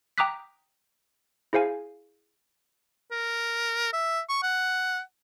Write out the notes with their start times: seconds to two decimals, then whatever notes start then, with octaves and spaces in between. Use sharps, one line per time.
0.18 G5 A#5 D6 D#6 F#6 B6
1.53 E4 G#4 C5 F5 G#5
3.11 A#4
3.93 E5
4.29 C#6
4.43 F#5